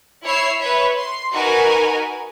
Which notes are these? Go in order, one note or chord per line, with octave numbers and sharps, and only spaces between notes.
E4 C#5 E6 C7
B4 C#5 E5
C6
D#4 F#4 A#4 B4 G#5